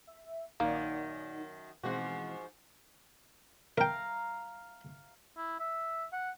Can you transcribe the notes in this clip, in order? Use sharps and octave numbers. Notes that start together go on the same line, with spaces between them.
E5
A#1 F#2 D#3 A#3 D#4 D5
G#2 B2 E3 F3 G#3 C4 F#4
A#4 F5 G5 A#5
E4
E5
F#5